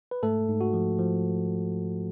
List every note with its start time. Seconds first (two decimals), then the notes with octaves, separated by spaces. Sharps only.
0.11 B4
0.23 G#2 A3 A4
0.49 G#2
0.61 F#4
0.74 F3
0.99 F3